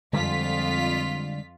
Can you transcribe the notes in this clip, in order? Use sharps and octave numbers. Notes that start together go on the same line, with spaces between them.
F2 D3 G3 G#3 F4 B6